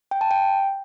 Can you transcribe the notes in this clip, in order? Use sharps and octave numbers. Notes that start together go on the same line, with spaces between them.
G5
A5
G5